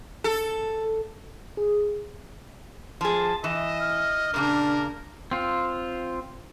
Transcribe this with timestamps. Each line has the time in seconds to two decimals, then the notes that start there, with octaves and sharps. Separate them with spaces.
0.24 A4
1.57 G#4
3.01 F3 G#4 A5
3.44 E3 D#5 E7
3.79 F6
4.34 A#2 C#3 A#3 D4 A#4
5.31 C4 F4